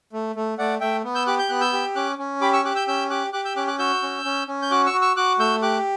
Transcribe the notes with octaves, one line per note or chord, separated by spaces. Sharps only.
A3
A3
A3 D5 F#5
A3 E5 G5
B3
E6 G6
G4 D6 F#6
G6
B3 F#6
E6 G6
G4
C#4 D6 F#6
C#4
G4 B5 D6
C#6 E6
G4 D6 F#6
E6 G6
C#4 E6 G6
G4 D6 F#6
G4 D6 F#6
E6 G6
C#4 D6 F#6
D6 F#6
F#4 E6 G6
C#4
C#4
C#4
G6
F#4 D6 F#6
C#6 E6
F#4
C#6 E6
F#4 D6 F#6
A3 E6 G6
G4 D6 F#6